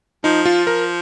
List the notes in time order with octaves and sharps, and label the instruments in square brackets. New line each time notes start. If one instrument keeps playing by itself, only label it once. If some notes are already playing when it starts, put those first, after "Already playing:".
[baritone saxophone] F3 [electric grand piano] D#4
[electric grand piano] F4
A#4